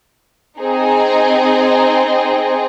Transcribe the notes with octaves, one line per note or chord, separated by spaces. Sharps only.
C4 D#4 G#4